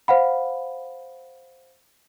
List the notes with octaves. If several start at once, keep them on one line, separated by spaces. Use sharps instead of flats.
C5 F5 F#5 B5